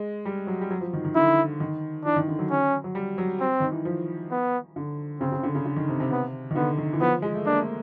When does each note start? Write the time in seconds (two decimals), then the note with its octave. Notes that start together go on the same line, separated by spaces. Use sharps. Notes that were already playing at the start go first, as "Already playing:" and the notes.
Already playing: G#3
0.25 G3
0.47 F#3
0.61 G3
0.71 F#3
0.81 F3
0.93 D#3
1.05 D#3
1.15 D3 E4
1.60 D#3
2.05 E3 D4
2.16 D#3
2.28 D3
2.39 F#3
2.50 C#4
2.84 F#3
2.95 G3
3.18 F#3
3.40 C4
3.60 D#3
3.72 E3
3.85 F3
4.31 B3
4.76 D3
5.20 C#3 C4
5.32 C#3
5.43 D3
5.55 C#3
5.65 D3
5.76 D#3
5.89 C3
6.00 C3
6.11 B3
6.51 D#3
6.55 D3 B3
6.78 D#3
6.93 E3
7.01 F3 B3
7.22 G#3
7.35 A3
7.45 A#3 D4
7.62 A3